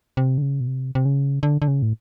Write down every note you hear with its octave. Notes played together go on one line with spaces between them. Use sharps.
C3
D3
C#3
B2
C3
C3
C#3
D3
D3
C#3
A2